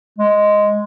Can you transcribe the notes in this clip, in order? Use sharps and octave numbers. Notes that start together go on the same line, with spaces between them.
G#3